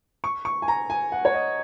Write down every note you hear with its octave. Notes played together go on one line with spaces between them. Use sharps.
C#6
C#6
G#5
A#5
G#5
F#5
C#5
D#5